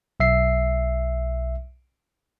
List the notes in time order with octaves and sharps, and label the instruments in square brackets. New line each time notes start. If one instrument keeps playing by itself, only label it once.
[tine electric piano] B1 E5 C7